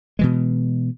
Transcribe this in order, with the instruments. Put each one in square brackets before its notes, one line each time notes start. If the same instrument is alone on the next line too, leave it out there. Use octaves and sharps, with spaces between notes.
[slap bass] B2 E3 G#3